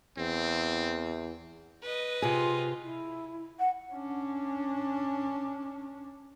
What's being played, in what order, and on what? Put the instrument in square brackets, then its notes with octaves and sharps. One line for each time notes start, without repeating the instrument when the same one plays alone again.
[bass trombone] E2 [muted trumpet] C4
[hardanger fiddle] B4 D#5
[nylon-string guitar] C3 G#4 [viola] F4
[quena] E4
F#5
[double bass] C#4 D4